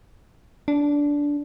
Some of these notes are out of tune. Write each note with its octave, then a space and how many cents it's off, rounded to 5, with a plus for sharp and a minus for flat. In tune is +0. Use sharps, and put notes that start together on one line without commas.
D4 -15